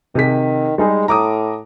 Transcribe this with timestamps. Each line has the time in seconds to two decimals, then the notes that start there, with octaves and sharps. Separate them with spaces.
0.15 C3 D#3 G#4 B6
0.78 G3 G#3 D#4 G#4
1.08 A2 A#5 D6 D#6